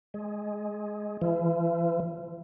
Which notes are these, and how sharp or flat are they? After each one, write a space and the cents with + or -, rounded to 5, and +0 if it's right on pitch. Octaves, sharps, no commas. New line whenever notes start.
G#3 +10
E3 +45